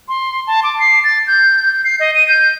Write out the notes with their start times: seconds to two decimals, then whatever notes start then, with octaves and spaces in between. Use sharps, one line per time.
0.08 C6
0.47 A5
0.63 D6
0.80 C7
1.04 A6
1.27 G6
1.72 G6
1.84 C7
1.99 D#5
2.15 D#7
2.28 G6